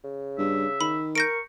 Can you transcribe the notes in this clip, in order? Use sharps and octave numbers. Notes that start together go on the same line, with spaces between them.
C#3
G2 E5
D#3 B5
A#4 C#6 G6 A#6 D7